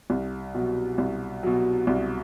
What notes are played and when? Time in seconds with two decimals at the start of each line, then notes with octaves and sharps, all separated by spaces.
0.10 C2
0.54 B2 F#3
0.98 C2
1.43 B2 F#3
1.87 C2